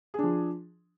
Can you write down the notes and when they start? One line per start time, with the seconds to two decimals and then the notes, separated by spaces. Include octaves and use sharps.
0.14 G#4
0.19 D4
0.23 F3